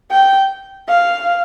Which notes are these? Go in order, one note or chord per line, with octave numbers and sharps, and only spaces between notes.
G5
F5